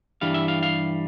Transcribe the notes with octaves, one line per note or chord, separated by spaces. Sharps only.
G2 E3 G3 F5
E5
F5
F5